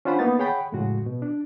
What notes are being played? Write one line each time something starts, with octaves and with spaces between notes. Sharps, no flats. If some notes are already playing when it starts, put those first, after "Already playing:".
C#4 D4 F4 C5 F#5 B5
A#3 B3 D#4 A6
G#4 C#5 F#5 G5 B5
F2 A2 C#3 G#3 F#4
B2
D4